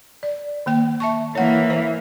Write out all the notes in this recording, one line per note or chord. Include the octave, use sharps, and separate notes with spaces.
D5
D#3 A#3 G5
E5 A5 C#6
E3 A#3 C#5 F#5
C5